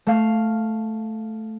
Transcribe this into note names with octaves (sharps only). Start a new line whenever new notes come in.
A3 F5